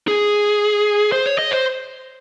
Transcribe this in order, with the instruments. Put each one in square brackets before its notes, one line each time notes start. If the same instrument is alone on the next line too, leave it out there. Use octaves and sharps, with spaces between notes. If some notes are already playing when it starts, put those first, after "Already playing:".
[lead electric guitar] G#4
C5
C#5
D#5
C5